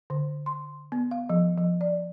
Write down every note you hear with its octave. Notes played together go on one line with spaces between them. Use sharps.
D3
C6
B3
F5
F3
F3
D5